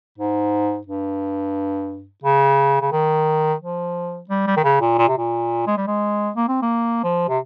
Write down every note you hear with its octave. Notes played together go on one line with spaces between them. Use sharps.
G#2
G2
C#3
C#3
D#3
F3
G3
G3
D#3
C#3
A#2
A#2
C3
A#2
G#3
G3
G#3
A#3
C4
A#3
F3
C3